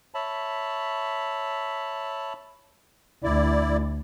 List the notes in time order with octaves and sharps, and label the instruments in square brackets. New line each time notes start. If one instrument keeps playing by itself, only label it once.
[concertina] C#5 E5 A5 B5
[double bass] D2 [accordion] E4 D5